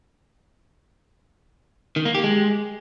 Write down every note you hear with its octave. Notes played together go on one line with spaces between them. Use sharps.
D#3
A#3
G4
G#3